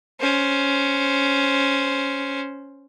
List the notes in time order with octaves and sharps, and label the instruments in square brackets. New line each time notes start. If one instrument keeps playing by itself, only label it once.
[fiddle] C#4 C5